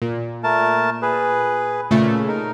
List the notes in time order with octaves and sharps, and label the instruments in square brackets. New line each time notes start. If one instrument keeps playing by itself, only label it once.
[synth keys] A#2
[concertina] A3 A#4 A5
G#4 B4
[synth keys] A#2 C#3 A3
[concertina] D#4 A#4